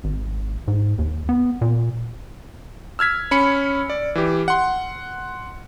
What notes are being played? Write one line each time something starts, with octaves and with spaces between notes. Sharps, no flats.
G#1
G#2
D#2
B3
A#2
E6 F6 G#6 B6
C#4 B5 C#7
D5
E3 G4
F#5 C6